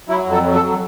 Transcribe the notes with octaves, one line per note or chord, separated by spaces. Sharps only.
F#3 E4
F2
A4
F#3
A4
F#3